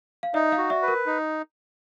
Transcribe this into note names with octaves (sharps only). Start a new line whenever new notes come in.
F5
D#4 D5 E5
D#5 F5
F#4
D5 E5
B4
A#4
D#4